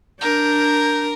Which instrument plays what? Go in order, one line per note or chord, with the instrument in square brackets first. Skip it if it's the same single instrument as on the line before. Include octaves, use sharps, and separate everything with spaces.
[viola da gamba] D4 [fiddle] A#4 [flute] G6